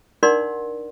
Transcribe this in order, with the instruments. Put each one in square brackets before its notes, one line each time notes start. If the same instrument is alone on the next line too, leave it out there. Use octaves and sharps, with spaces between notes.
[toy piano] D4 D#4 A#4 D5 F#5 C6